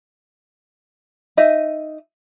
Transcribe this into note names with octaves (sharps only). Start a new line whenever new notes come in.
D#4 D#5 E5